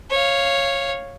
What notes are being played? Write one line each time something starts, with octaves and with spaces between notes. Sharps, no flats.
C#5 F5